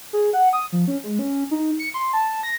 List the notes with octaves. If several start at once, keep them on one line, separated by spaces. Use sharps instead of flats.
G#4
F#5
D#6
F3
C#4
G#3
C#4
D#4
C#7
C6
A5
A#6